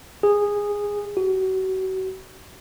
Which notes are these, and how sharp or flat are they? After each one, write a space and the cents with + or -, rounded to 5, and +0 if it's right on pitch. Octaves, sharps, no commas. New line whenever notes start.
G#4 -15
F#4 +35